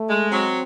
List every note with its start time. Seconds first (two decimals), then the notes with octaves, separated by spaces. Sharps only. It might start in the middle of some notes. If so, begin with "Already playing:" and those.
Already playing: A3
0.10 G#3
0.32 F#3 C4